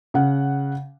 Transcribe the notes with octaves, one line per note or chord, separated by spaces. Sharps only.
C#3 F#5